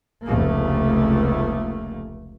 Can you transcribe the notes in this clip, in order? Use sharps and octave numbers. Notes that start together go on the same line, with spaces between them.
F1 C#2 A3 A#3